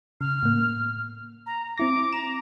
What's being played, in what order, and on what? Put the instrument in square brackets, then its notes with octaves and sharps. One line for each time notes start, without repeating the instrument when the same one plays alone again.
[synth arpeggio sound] C#3 [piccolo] F6
[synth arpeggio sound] A2 A#3
[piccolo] A#5
[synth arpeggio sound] C4 E4 A#6 [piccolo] D6
[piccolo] A#5 [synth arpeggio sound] E7